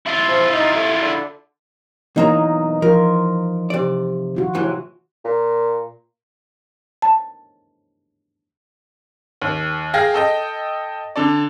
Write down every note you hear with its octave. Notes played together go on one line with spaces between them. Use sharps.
E4 F4
F3
D#4
A3
D3
B1 E3 A#3 D#4 D#5 A#5
F3 F4 A#4
C3 D5
D#3 F4 F#4
C2 A2 E3
A#2
A5
D#2
G#4 F5 G5 A#6
A4 D#5 G5
D3 A4 D5